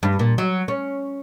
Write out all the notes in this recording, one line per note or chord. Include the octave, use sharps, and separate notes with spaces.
G2
A#2
F#3
C#4